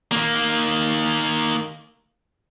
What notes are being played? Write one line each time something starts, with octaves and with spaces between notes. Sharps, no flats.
D#3 A#3